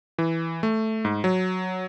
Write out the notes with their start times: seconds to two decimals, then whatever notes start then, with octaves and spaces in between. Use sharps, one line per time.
0.18 E3
0.63 A3
1.05 G#2
1.24 F#3